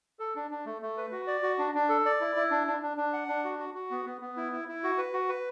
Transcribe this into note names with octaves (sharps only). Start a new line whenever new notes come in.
A4
D4
D4
A3
A3
B4
F#4
D5
F#4
D4
D4
A4
D5
E4
E4
D4
D4
D4
D4
F#5
D4
F#4
F#4
F#4
B3
B3
B3
E4
E4
E4
F#4
B4
F#4
B4